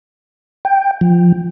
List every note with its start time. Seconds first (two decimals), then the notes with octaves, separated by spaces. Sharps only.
0.65 G5
1.01 F3